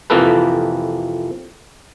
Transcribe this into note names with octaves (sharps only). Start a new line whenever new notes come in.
F2 C3 E3 A#3 A4 B4